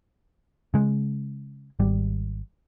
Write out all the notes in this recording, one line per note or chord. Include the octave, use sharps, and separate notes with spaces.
C#3 G#3
G#1 G3